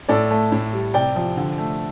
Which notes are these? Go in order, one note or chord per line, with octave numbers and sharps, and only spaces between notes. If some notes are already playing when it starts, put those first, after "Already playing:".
A2 A4 D5
A3
A2
G3
C3 D5 G5
F3
D3
A3